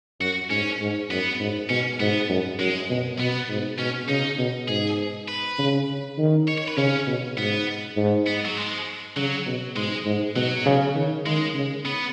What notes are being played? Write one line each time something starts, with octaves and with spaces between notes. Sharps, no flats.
F#2 F#4
G#2 C#4
G#2
F#2 B3
G#2
B2 C#4
G#2 B3
F#2
F#2 G#3
B2
B2 B3
G#2
B2 C#4
C#3 D#4
B2
G#2 G#4
B4
C#3
D#3
C#5
C#5
B4
C#3 C#4
B2
G#2 B3
G#2
B3
F#3
G#3
C#3 F#3
B2
G#2 G#3
G#2
B2 F#3
C#3
D#3
D#3 G#3
C#3
B3